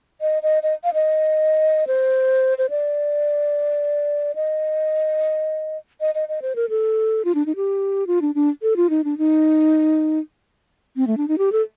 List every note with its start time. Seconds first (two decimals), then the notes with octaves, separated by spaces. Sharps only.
0.21 D#5
0.43 D#5
0.63 D#5
0.84 F5
0.94 D#5
1.87 C5
2.58 C5
2.70 D5
4.35 D#5
6.01 D#5
6.15 D#5
6.28 D#5
6.42 C5
6.56 A#4
6.69 A4
7.25 F4
7.35 D4
7.46 D#4
7.56 G4
8.07 F4
8.22 D4
8.35 D4
8.62 A4
8.76 F4
8.90 D#4
9.04 D4
9.18 D#4
10.97 C4
11.07 A3
11.17 D4
11.28 D#4
11.38 G4
11.52 A4